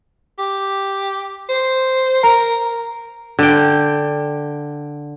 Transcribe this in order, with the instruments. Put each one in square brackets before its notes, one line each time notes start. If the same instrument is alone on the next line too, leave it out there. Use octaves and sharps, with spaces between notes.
[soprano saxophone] G4
C5
[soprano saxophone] A#4 [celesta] A#5
[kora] D3 G5